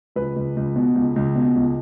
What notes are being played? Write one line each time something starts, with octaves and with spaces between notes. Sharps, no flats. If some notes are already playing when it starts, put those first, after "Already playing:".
C#2 B4
C#2
C#2
B2
C#2
C#2
B2
C#2